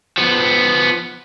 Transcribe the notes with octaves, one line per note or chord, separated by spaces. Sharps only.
F3 B3